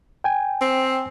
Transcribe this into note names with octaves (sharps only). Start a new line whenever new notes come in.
G5 G#5
C4